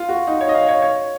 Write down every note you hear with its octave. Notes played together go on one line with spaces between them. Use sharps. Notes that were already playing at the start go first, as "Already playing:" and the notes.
Already playing: F4
F#4
D#4
C#5
D#5
F5
C#5
C#5